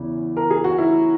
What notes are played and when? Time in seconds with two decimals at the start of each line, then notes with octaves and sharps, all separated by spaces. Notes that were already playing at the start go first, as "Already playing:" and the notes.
Already playing: E2 C#3 E4
0.37 A#4
0.50 G#4
0.64 F#4
0.78 E4